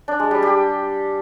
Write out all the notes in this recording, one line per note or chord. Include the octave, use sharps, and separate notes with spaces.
D4
G#3
G3
G4